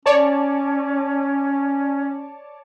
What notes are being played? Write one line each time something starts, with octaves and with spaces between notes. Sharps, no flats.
C#4 C#5 D5 A5